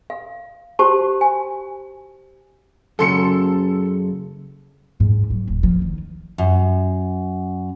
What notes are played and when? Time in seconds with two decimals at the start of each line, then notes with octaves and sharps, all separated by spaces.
0.10 F5
0.79 F#4 G4 C5 A5 C#6
1.21 G#5
2.99 F#2 C#3 A4 C6 C#7
5.00 G#2
5.30 F#3
5.48 D#1
5.63 F3
5.82 D#3
6.38 F#2